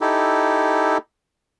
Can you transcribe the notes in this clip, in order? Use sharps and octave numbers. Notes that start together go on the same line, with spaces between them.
D#4 E4 G4 A4